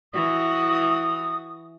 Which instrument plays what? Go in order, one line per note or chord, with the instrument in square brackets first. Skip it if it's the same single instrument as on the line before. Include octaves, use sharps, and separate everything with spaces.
[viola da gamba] E3 F#4 [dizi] D#6